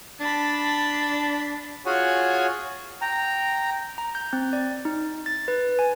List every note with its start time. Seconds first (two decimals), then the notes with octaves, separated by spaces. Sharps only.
0.20 D4 A5 B5
1.86 F4 F#4 G#4 C#5 F#5 G#5
3.01 G5 A#5
3.98 A#5
4.15 G6
4.33 C4
4.53 D5
4.85 D#4
5.26 A6
5.48 B4
5.79 G#5